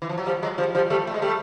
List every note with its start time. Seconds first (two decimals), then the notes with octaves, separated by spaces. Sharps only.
0.02 E3
0.09 F3
0.18 F#3
0.26 F3 G3
0.43 F#3 G#3
0.58 F3 G3
0.75 F3 G3
0.90 G3 A3
1.07 A3
1.14 G#3
1.22 G3 A3